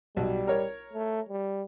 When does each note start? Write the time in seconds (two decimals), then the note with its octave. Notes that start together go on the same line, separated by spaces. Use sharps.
0.17 B1 F#3 G3
0.47 A#4 C#5
0.94 A3
1.29 G3